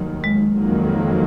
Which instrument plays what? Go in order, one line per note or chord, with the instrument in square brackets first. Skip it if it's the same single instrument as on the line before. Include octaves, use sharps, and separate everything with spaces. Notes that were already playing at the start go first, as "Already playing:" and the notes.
Already playing: [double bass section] F1 D#2 D#3 F#3
[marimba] G#3
[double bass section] F#1 F2 D#3 F#3 A#3